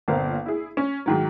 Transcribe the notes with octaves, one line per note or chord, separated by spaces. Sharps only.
G1 A#2 C4 A#4 F5
E4 G#4
C#4
G#2 D#3 F#3